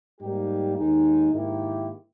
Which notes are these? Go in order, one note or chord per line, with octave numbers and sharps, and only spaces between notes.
G#2 G3 A#3 D#4 G4
D#2 D#3 G#3 D#4
G#2 D#3 A#3 E4 G4